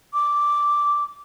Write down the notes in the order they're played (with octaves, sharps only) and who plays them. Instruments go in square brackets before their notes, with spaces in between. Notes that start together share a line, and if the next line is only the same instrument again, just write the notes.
[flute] D6